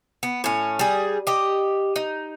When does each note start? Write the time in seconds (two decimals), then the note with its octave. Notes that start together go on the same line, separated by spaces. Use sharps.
0.23 B3
0.44 A2 C#4
0.79 G3 G#4
1.27 G4 D#5
1.96 D#4